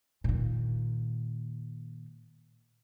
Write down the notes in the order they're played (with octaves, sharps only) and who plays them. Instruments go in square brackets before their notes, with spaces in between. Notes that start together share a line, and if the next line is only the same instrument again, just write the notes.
[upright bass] A#2 D#3